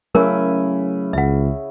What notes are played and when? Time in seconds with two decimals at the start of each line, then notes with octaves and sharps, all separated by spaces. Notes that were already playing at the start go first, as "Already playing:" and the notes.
0.15 C#3 F#3 A3 C#4 E4 A#4 G#5
1.13 C#2 E5 F#5